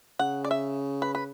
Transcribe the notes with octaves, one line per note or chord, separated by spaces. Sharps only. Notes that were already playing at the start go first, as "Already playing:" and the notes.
C#3 F#5
D5
E5
B4
B4